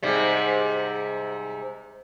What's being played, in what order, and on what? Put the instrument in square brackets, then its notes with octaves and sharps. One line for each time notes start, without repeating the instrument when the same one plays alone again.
[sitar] G#2 C3 G3